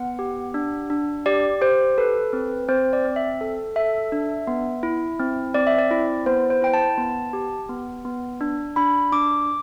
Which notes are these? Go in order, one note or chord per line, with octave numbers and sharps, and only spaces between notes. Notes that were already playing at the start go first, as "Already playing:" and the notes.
Already playing: B3 F#5
G4
D4
D4
G4 D5
G4 C5
A4 B4
C4
C4 C5
D5
C4
E5
A4
A4 E5
D4
B3
E4
C4
C4 D5
E5
D5
E4
B3 C5
C5
E4 G5
A5
B3
G4
B3
B3
D4
D4 B5
D4 D6